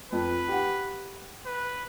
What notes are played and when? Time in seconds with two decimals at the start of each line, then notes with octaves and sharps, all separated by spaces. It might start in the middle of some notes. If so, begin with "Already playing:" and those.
0.12 F2 B4
0.48 G4 F#5
1.46 B4